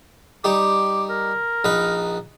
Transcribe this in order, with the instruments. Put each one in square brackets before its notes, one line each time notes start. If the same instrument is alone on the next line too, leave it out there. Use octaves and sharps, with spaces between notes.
[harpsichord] G3 D#4 G4 [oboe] D6
[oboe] A#4
[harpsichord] A#1 D#4 B4